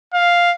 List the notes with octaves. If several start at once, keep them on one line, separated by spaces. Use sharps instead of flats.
F5